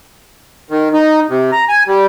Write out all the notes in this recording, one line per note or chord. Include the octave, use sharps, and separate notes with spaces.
D#3
D#4
C3
A#5
G#5
G3